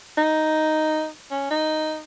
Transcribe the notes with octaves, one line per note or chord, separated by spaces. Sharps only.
D#4
C#4
D#4